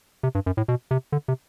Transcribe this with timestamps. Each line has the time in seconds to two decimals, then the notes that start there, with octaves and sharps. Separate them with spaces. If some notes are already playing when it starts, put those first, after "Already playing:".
0.23 C3
0.35 G2
0.46 F#2
0.57 A2
0.68 B2
0.91 C3
1.12 D3
1.28 C3